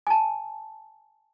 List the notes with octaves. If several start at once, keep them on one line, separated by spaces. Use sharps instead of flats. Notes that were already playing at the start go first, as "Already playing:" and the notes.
G#5 A5